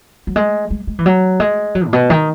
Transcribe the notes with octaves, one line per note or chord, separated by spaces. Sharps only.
F#3
G#3
G#3
G#3
E3
F#3
G#3
F#3
A2
B2
D#3